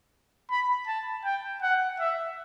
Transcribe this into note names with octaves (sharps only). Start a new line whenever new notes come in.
B5
A5
G5
F#5
E5